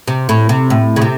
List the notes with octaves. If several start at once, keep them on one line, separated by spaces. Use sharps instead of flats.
C3
A2
C3
A2
C#3
C3